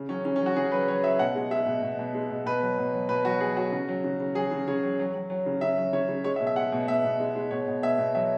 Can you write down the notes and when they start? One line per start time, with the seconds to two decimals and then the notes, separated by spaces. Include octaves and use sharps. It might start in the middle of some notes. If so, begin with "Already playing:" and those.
Already playing: C#3
0.09 F#3 C#4
0.25 C#3 C#4
0.36 C#4
0.41 F#3 F#4
0.56 C#3 G#4
0.72 F#3 B4
0.88 F#3 C#5
1.04 F#3 E5
1.19 B2 F#5
1.36 G#3
1.51 G#3 E5
1.66 B2
1.82 B2
1.99 B2
2.15 G#3
2.30 B2
2.46 B2 B4
2.62 F#3
2.78 B2
2.94 F#3
3.09 B2 B4
3.25 F#3 F#4
3.40 F#3 G#4
3.57 F#3 F#4
3.72 C#3
3.89 F#3
4.04 C#3
4.20 C#3
4.35 F#3 G#4
4.51 C#3
4.68 C#3 C#5
4.83 F#3
4.99 F#3
5.14 F#3
5.30 F#3
5.46 C#3
5.61 C#3 E5
5.78 F#3
5.93 C#3 C#5
6.09 C#3
6.24 G#3 C#5
6.36 E5
6.40 B2
6.47 E5
6.56 G#3 F#5
6.72 B2
6.88 B2 E5
7.05 B2
7.20 G#3
7.36 G#3
7.51 B2 C#5
7.68 B2
7.82 B2 E5
7.99 B2
8.15 F#3 E5